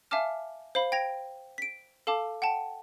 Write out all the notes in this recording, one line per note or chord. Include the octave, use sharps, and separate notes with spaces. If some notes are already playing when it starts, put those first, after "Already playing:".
E5 F5 G#5 A5 D6 F6
C5 F5 B5
G5 G#6 A#6 D7 F7
B6 D7
A4 F5 A5 D6
F#5 G5 A5